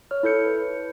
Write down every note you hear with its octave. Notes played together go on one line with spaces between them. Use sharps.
C#5 F6
E4 A4 G6 C#7
B4